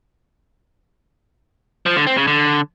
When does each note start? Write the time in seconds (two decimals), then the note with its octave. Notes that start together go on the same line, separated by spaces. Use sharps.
1.86 F3
1.96 D3
2.07 C4
2.17 C#3
2.27 D3